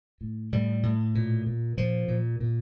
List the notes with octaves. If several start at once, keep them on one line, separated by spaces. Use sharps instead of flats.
A2
A2 G3
A2
A#2
A#2
A#2 F3
A#2
A#2